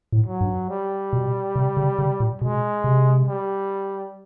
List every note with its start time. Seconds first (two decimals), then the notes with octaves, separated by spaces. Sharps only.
0.12 A2
0.26 F#3
0.41 G2
0.70 G3
1.13 B2
1.56 C3
1.77 C#3
1.99 C#3
2.20 A#2
2.42 B2 G#3
2.84 C3
3.28 G3